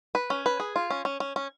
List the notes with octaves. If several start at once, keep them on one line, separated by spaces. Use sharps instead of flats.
B4
C#4
B4
G#4
F4
C#4
C#4
C#4
C#4